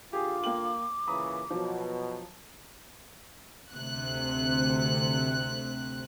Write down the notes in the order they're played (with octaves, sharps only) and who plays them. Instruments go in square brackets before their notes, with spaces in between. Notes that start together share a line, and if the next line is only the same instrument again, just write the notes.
[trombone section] D3 F4 [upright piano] G4 G#4 [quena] D6
[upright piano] A#3 G5 F#7
[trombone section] A#2 C#3 E3 [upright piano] A#5 B5 D#6
[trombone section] B2 [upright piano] F3 F#3
[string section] D2 C3 F#6